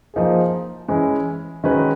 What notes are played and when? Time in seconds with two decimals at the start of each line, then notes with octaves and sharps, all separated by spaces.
0.14 F3 A#3 D#4 G#4
0.88 E3 G#3 C#4 E4
1.64 D#3 G#3 C#4 F#4 B4